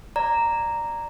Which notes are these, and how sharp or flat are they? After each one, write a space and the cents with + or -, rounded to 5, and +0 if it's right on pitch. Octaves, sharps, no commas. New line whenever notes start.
D5 +0 A#5 -5